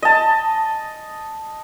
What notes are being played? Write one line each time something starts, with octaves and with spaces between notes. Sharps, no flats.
D#5 A5